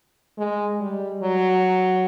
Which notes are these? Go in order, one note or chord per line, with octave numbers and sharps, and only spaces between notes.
G#3
G3
F#3